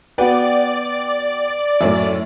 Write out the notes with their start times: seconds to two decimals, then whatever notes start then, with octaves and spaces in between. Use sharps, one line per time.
0.18 B3 F#4 B4 D5 G5
1.81 F#2 A2 C#5 E5